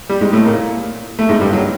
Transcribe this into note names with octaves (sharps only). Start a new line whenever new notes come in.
G3
G#2 G#3
A2 A3
A#2 A#3
A3
G#2 G#3
G2 G3
F#3